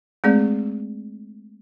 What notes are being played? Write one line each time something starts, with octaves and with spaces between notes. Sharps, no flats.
G#3 A3 C4 G#4 D5